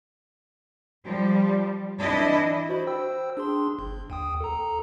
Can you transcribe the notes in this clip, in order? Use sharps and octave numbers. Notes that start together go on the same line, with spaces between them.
F3 G3
E3 D4 E4 D#5
F#4 C5 B5
C5 G5 E6
D4 G#4 C6
G1
D#2 G5 D#6
A4 A#5